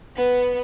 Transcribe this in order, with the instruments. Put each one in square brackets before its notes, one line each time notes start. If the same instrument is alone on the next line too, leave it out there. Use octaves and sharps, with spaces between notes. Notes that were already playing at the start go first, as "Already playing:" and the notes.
[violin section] B3